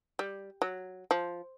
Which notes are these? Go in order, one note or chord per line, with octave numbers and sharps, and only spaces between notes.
G3
F#3
F3